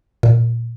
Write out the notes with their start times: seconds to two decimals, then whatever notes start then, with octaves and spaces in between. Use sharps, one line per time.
0.23 A#2